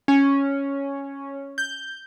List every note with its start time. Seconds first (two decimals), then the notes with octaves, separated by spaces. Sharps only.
0.08 C#4
1.58 G6